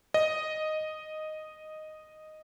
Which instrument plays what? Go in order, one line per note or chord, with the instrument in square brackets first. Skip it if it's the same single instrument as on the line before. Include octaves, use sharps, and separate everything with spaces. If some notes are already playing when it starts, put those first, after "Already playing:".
[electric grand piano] D#5